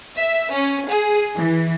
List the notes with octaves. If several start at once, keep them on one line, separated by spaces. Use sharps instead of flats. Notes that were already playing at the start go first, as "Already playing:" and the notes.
E5
C#4
G#4
E3